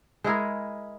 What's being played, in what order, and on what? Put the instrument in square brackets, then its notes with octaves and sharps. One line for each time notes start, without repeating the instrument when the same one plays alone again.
[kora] G#3 E4 G#4 A#4